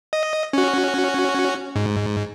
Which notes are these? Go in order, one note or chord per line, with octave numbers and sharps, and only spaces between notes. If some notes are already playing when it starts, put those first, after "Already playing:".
D#5
C#4 F#4
G#2